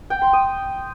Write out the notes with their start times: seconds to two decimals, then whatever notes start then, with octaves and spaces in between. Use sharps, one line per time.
0.10 G5
0.22 C6
0.33 D#6